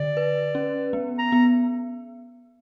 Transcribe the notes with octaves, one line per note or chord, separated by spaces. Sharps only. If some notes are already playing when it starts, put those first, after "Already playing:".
Already playing: D3 D5
B4
C#4
B3
A#5
B3